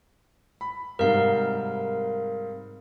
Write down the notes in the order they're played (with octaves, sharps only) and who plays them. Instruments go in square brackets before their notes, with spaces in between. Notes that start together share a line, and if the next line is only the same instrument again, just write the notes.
[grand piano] B5
[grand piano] G#2 C3 G3 [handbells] A#4 F5